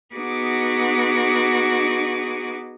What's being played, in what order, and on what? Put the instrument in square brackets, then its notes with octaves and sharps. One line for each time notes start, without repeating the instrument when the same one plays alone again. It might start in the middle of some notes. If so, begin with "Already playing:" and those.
[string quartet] B3 D#4 F#4 G#4 D6